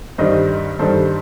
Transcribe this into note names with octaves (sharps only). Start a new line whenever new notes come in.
G2 D#3 G3 C5 D#5
G2 D#3 G3 A4 C5